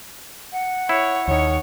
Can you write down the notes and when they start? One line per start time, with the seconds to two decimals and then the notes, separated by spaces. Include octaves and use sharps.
0.53 F#5
0.89 E4 C#5
1.28 D#2 D#3 C#5